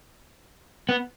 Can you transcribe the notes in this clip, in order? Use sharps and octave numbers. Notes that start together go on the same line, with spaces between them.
B3